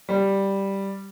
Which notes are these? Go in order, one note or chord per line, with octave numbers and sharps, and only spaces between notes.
G3